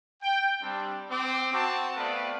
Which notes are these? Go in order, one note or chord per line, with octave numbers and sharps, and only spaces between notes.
G5
G3 C4 D4
C4 D6
C4 F#4 A5
A3 B3 C4 B4 D5 F5